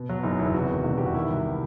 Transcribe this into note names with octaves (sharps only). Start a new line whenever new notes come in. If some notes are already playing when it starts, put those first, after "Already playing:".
Already playing: B2
F#3
F#1 D#4
E2 E4
C3 F#4
D#3
E1
E2 G4
F#4
D#3 E4
C2